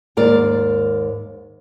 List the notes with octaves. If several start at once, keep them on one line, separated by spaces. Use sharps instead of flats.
D#2 G#2 A#4 D5